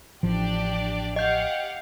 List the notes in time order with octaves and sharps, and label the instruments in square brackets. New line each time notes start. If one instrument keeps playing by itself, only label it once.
[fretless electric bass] A1 F3 [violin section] D4 G4 D5
[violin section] G4 F5 F#5 [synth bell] D#5 G6